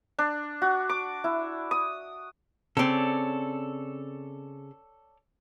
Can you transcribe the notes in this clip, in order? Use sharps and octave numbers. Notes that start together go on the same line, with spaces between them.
D4
F#4
D6
E4
D#6
C#3 C4 A4 C#5 D5